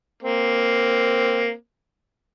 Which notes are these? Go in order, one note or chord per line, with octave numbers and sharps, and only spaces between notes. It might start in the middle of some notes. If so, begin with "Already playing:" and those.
A#3 C4